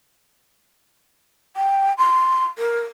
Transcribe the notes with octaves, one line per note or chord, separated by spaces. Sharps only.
G5
C6
A#4